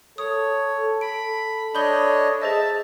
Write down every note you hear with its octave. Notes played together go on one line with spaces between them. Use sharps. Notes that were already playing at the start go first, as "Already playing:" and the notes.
A4 C#5 D#6
B5 D7
D4 C#5 D#5 B5 G6 G7
G#4 C5 D#5 E5 A5